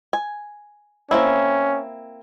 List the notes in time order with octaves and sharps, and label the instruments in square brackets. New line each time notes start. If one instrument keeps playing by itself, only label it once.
[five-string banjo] G#5
[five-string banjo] A#3 C4 E4 [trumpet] C#4